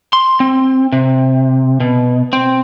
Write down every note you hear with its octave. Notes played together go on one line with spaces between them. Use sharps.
C6
C4
C3
B2
C4